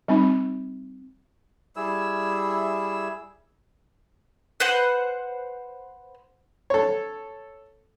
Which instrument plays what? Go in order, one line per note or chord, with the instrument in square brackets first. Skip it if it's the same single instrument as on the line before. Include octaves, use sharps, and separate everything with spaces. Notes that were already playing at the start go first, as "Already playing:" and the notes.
[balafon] G3 C4 D#4
[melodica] G3 E4 G#4 E6
[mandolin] B4 C5 F#5
[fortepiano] A4 C#5